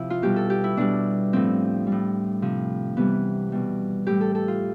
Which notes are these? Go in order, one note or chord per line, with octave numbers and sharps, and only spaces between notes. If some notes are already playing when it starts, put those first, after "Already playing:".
Already playing: C3 F3 E4
F4
B2 G3 G4
A4
G4
E4
B2 G3 D4
A2 F3 C4
G3
A2
C3 F3
C3 E3 G3 B3
B2 G3
A2 G3 G4
A4
A4
F4